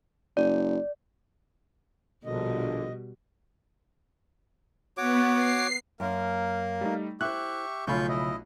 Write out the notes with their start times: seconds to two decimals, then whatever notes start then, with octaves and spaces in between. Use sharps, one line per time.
0.37 F#1 D5
2.25 A#1 B2 D3 G3 D#5
4.97 B3 F#4 C#5 D6
5.35 C7
6.00 F#2 A#3 A#4
6.81 G3 A3 D#4
7.21 E4 G4 C5 E5 C#6 F#6
7.87 B1 C#3 F3 A3 F4 B5 C#6 G6
8.08 E4 D#5